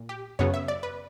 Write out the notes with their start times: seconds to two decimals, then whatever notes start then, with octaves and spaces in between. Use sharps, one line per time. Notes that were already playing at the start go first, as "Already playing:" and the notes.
Already playing: A#2
0.09 G4
0.39 F#2 C#3 F#3 B3 C#5
0.54 E5
0.68 D5
0.83 B4